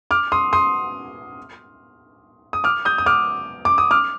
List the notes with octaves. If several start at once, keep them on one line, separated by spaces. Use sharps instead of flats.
D6 F6
C6 D#6
C6 D#6
D#6
D6 F6
D#6 G6
D#6
D6 F6
D6
D#6
D6 F6